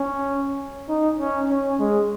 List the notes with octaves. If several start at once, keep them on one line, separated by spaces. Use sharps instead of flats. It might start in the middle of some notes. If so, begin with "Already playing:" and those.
Already playing: C#4
D#4
C#4
C#4
G#3